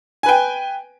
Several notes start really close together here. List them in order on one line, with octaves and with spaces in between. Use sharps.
G#5 B4 G5